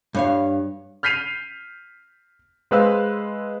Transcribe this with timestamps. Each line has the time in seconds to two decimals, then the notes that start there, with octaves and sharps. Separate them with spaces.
0.15 G2 C#5 F5
1.03 F6 G6 B6 C7 D#7 F7
2.71 G#3 G#4 B4 C5 F5 E6